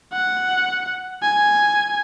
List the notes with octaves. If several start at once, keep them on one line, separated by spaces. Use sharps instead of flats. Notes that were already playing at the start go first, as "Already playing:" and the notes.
F#5
G#5